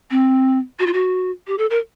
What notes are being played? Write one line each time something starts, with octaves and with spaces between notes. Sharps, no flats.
C4
F#4
F4
F#4
G4
A4
A#4